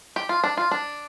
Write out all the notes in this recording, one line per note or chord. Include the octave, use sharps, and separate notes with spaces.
G4
F4
D4
F4
D4